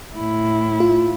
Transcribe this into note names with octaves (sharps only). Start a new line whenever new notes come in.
A2 E4
F4